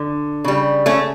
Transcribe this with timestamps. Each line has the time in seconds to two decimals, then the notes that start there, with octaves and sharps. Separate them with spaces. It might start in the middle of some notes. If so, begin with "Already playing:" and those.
Already playing: D3
0.44 C#3 G3
0.86 A3 C#4